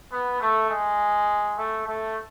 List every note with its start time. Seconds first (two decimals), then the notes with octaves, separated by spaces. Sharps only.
0.11 B3
0.40 A3
0.70 G#3
1.57 A3
1.86 A3